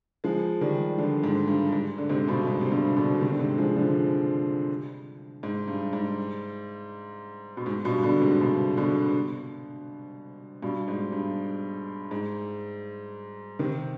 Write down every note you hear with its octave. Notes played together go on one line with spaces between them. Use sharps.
F3 G#3
D#3 G3
D3 F3
G#2
G2
G#2
D3
G#2 C3
G2 B2
G#2
C3
G2 B2
B2 D3
C3 D#3
D3
G#2 C3
F3 G#3
D3 F3
G#2
G2
G#2
B2
G#2
G2 B2
B2 D3
G#2 C3
G2 B2
B2 D3
G2 B2
G#2
G2
G#2
C3 D#3